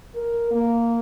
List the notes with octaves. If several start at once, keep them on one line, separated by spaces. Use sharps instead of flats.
A#4
A#3